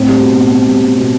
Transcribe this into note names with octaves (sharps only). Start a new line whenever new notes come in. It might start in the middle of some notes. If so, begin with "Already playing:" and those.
Already playing: A2 C4
G3
B2
B2
C4
G3
B2
B2